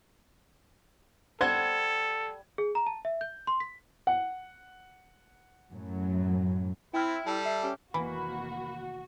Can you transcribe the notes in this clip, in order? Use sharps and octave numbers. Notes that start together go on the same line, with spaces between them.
G3 A4 C5 F#5 G#6
G#4
A#5
A5
E5
G6
C6
B6
F#5
F#2 A2 F#3
C4 E4 G5 F6
G3 A4 A5
E5 E6 C7
C#4 G4
F1 D#3 E3 A#3 F#4 B5